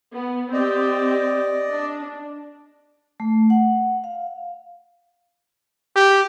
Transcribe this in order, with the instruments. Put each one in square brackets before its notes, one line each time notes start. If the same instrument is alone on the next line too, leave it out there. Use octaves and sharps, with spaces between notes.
[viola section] B3
[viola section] C4 G4 [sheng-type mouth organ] D5 D#5
[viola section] D4
[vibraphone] A3
F#5
F5
[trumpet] G4